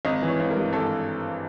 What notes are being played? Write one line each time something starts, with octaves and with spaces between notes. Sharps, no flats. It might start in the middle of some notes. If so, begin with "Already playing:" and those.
G#1 D#5
E3
C#5
G#1
A#4
G2
G#1 A4